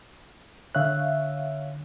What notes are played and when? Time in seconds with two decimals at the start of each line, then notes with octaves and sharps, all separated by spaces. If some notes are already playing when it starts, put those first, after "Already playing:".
0.75 D3 C#5 E5 F5 F#6